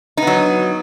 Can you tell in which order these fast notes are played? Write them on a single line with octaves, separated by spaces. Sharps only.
D#4 B3 F#3